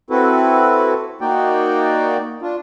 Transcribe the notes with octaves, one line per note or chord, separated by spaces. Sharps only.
C4 E4 F#4 A4 B4
A#3 D#4 F#4 D5 G5
D4 F4